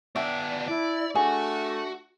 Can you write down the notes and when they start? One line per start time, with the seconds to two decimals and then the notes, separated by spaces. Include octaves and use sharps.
0.16 B3 D4 D5 E5 G5
0.68 E4 D5
1.15 A3 D4 F#4 G#4